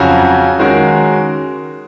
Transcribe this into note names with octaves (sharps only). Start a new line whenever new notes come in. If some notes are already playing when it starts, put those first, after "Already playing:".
Already playing: F2 C#3 F#3 C#4 F#4
D#3 G#3 C#4 F#4 A#4